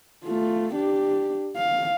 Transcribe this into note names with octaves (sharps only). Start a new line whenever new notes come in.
A3 F4
D4 G4
F5